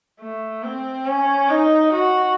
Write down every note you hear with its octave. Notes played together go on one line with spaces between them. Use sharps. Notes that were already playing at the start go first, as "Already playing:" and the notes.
A3
C4
C#4
D#4
F#4